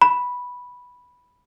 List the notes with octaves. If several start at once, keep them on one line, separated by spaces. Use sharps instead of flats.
B5